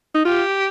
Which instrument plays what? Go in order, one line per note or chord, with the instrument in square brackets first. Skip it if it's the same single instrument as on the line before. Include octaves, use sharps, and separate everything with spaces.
[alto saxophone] D#4
[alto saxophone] F4 [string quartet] G4